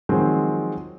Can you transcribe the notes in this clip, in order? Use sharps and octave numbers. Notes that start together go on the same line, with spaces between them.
D#3 F3 F#3 G#3 C4